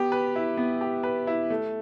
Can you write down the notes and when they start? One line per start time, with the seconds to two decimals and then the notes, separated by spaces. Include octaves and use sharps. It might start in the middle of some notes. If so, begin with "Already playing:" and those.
Already playing: B3 G4
0.12 B4
0.36 E4
0.57 B3
0.81 G4
1.03 B4
1.27 E4
1.50 A3